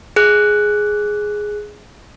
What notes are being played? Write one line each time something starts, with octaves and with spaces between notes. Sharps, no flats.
G#4 F#6